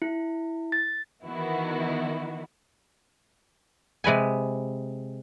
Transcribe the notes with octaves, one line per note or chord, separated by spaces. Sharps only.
E4
A6
D#3 E3 B3 E4 F#4
C3 G#3 B4 G#5